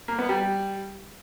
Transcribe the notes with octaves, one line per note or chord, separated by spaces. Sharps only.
A#3
B3
G3